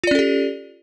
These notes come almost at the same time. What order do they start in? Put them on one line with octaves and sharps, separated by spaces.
F4 D5 C#4 A4 G4